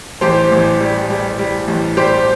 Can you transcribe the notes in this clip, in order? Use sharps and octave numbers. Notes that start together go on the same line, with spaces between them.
A1 G4 C5
A1
G3
G3
G3
A1
G3 G4 C5